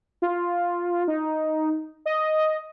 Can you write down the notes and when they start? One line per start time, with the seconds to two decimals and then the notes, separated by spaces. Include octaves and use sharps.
0.22 F4
1.08 D#4
2.06 D#5